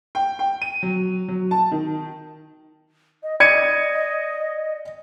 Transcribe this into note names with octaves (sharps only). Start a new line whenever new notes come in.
G5
G5
D#7
F#3
F#3
A5
D#3
D#5
D5 D#5 G#6 C#7 D#7